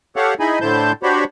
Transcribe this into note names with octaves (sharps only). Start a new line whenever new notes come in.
G4 A4 C#5 F5 F#5
D#4 E4 G#4 D#5 G#5 B5
A2 D3 E4 C5 A5 G6
D4 F#4 G4 C5 C#5 B5